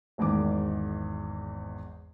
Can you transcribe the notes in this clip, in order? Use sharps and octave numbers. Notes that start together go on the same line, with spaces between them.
G#1 E2 G#2 D#3 D6